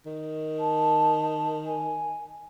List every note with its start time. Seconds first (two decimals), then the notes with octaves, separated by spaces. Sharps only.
0.06 D#3
0.59 A5
1.66 G#5